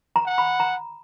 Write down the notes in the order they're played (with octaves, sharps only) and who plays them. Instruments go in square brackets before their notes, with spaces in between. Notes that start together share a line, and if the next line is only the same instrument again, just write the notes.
[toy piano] A#5
[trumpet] F#5
[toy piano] B5
A#5